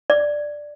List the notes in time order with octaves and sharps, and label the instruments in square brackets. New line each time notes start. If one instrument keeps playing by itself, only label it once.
[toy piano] D5